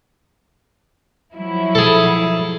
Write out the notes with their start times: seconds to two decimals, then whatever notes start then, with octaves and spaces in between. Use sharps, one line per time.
1.35 F3 F#3 E4
1.75 G#4 A4